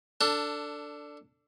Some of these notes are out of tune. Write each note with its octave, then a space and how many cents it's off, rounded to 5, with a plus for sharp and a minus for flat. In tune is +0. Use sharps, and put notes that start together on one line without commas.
D4 +0 A4 +20